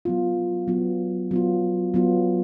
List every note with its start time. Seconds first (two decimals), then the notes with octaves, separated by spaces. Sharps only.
0.05 F#3 B3 F4
0.68 F#3 B3 F4
1.31 F#3 B3 F4
1.94 F#3 B3 F4